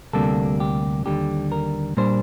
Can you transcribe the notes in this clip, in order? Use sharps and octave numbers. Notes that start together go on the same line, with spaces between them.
D2 C3 G3 A#3 D4 A4
G4
D#2 D3 G3 G4
A#4
A#2 G3 A#3 D4 C5